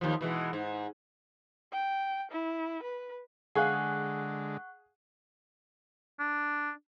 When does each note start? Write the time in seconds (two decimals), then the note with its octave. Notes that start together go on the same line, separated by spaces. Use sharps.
0.01 D#2 F3
0.21 B2 E3 G#3
0.53 G#2
1.72 G5
2.31 E4
2.83 B4
3.55 D3 G#3 G#4 F5 F#5 C#6 F#6
6.20 D4